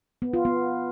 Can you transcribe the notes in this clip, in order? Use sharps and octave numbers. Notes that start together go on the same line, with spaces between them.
B3
F4
B3